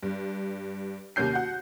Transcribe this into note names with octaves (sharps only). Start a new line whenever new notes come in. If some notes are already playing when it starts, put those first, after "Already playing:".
G2
D#2 C3 A#3 C#4 G6 C7
F#4 F#5